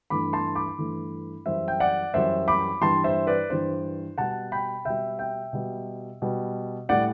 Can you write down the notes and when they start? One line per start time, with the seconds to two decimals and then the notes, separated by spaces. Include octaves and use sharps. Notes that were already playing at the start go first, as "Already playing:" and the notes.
0.10 G2 E3 A3 B5 D6
0.33 A5 C6
0.55 B5 D6
0.78 G2 E3 A3
1.46 F#2 E3 G3 C5 E5
1.68 G5
1.80 D5 F#5
2.14 F#2 E3 G3 C5 E5
2.48 B5 D6
2.81 G2 E3 G3 A5 C6
3.04 C5 E5
3.27 B4 D5
3.50 G2 E3 G3 C5
4.18 B2 G3 F#5 A5
4.52 G5 B5
4.85 B2 G3 E5 G5
5.19 E5 G5
5.53 B2 G3
6.22 B2 G3
6.89 A2 G3 D5 F#5